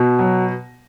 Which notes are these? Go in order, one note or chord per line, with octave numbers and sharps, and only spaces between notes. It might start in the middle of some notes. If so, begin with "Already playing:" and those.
Already playing: B2
F#3